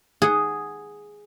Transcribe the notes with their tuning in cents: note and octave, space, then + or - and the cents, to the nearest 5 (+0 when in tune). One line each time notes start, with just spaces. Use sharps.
G#4 +0 F#5 +0